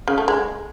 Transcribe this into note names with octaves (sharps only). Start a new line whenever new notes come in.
C#3
A3
G#3